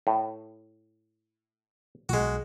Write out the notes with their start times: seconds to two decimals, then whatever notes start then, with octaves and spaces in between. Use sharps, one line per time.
0.07 A2
2.09 B1 G#3 F#4